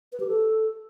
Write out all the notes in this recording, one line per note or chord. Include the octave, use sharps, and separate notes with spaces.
B4
G4
A4